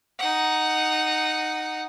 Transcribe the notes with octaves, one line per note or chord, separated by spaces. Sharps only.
D#4 F#5